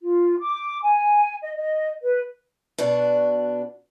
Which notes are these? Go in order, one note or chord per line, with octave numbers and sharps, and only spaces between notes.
F4
D6
G#5
D#5
D#5
B4
B2 D4 F#4